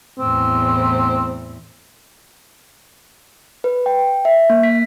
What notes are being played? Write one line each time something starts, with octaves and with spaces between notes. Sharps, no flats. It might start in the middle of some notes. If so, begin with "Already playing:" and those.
E2 A2 C4
B4
G5
E5
A#3
B6